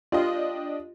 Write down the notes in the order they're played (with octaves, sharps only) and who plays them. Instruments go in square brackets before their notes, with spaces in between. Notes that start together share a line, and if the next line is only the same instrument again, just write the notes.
[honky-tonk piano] D4 G4 D#5 [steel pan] F4